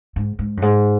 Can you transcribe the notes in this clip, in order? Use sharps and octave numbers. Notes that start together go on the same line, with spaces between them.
G#2
G#2
F#2
G#2